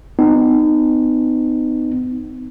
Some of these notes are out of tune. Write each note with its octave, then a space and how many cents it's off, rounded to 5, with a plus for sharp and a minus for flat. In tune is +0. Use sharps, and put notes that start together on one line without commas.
B3 +40 D#4 -20